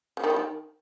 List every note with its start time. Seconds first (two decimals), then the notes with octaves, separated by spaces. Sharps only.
0.17 C#3
0.24 D#3
0.30 G3
0.36 D#3